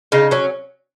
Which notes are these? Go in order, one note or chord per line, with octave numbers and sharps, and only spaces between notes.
C#3 D#4
F#3 C#4